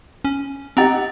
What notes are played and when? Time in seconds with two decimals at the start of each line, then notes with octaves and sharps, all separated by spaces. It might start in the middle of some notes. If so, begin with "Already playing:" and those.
0.25 C#4
0.77 C4 D#4 G4 F#5 A#5 A6